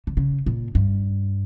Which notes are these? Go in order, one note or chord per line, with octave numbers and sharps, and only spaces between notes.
D3
C#3
A#2
G2